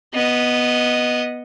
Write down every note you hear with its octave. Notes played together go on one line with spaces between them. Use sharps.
B3 D#5